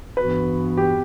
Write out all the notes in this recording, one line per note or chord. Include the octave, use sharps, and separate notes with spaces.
G2 E3 B3 F#4 B4
G4